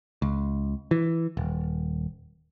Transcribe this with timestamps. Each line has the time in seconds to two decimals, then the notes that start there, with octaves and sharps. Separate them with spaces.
0.22 C#2
0.91 E3
1.37 D#1